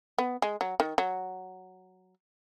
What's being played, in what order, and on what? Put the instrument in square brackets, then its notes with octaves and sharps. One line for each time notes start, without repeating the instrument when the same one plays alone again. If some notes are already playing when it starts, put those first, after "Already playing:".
[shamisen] B3
G#3
F#3
D#3
F#3